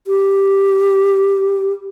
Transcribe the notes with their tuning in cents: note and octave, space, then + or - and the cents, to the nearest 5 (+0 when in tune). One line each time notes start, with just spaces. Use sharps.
G4 +0